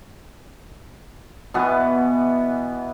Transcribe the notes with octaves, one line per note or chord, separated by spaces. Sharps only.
B2 E3 B3 F#5